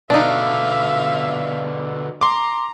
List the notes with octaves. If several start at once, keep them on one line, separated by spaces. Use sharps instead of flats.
B2 D3 D4 D#4 E5 F5
A#5 C6 D6